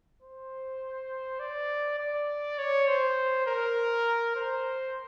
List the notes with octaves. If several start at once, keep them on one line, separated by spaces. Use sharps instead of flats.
C5
D5
D5
C#5
C5
A#4
C5